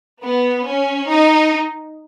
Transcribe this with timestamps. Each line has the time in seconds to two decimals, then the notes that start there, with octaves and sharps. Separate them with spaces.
0.23 B3
0.66 C#4
1.09 D#4